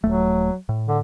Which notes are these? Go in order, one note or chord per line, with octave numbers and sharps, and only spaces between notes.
D#1 F#3 A3
A2
D3